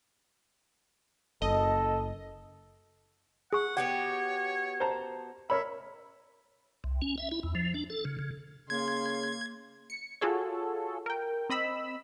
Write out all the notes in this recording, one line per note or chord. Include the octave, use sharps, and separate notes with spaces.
F#1 A4 D#5
G#4 F#5 C#6
B3 F#4 G4 C#5 F#5
C5 A5 A#5
A#4 C#5 E5 B5
C2
C#4
E5
E4
E2
F3
D4
A4
C#3
C#3
C#3 A#3 C6 G#6
C#7
F4 F#4 G#4 A4 C#5
A#4 G5
C4 D#5 B5 E6 B6